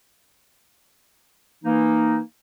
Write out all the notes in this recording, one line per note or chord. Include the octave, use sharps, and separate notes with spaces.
E3 A#3 D#4